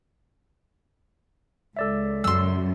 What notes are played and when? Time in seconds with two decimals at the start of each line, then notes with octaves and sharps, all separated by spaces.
1.77 C#2 A4 D5 E5
2.24 F#2 C6 E6